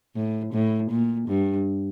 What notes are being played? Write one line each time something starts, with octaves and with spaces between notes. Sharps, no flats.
A2
A2
A#2
G2